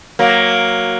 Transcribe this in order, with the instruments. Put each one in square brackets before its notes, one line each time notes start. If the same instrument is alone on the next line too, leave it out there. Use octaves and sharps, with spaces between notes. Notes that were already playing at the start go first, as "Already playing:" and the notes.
[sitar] F#3 A#3